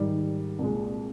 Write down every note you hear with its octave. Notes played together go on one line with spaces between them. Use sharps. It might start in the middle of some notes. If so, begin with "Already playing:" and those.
Already playing: G#2 D#3 G3
C2 A#2 G#3